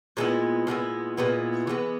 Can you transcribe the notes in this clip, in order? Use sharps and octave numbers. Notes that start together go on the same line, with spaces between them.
A#2 G#3 B3 E4
A#2 G#3 B3 E4
A#2 G#3 B3 E4
E3 G#3 B3